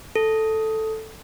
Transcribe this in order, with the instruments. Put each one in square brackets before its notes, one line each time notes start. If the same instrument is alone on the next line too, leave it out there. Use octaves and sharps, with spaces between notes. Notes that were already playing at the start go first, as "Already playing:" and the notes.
[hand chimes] A4